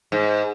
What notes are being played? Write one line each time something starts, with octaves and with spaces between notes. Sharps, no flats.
G#2